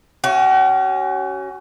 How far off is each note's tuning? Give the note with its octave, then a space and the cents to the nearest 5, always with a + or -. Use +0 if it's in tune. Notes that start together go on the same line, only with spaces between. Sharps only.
C#4 +0 F#4 +40